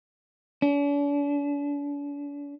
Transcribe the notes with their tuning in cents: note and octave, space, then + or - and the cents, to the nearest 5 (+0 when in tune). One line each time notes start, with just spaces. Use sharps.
D4 -45